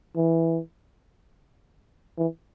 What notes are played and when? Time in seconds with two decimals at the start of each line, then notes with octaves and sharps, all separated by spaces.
0.16 E3
2.18 E3